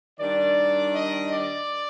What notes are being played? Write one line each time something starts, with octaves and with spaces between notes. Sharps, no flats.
D#3 G3 D4 D5
D#5
D5